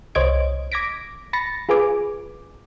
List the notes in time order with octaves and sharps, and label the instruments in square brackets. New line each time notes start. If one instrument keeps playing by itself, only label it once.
[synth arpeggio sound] C2 C5 C#5 D#5 G#6 D7
D6 G#6 A#6 B6 D7
B5 A6 A#6 C#7
F4 G#4 B4 G#5 D6